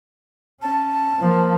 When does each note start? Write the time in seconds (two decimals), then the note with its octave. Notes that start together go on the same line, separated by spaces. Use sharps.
0.62 C#4 A5
1.20 F3 A#3